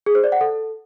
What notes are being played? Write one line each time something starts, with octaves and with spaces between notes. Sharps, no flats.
G#4
C5
D5
F#5
A4